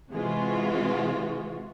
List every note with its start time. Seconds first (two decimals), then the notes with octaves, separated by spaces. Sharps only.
0.11 C3 E3 G#3 F4 F#4